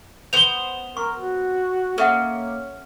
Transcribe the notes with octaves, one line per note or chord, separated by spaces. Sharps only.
B3 C5 F7 G7
A#4 C#6
F#4
A#3 C#4 A4 E5 F#5